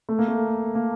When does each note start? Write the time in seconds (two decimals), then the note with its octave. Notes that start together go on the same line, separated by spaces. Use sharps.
0.09 A3
0.19 A#3
0.28 A3
0.75 A#3